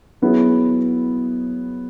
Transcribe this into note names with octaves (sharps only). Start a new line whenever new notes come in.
F#3 B3 E4 G#4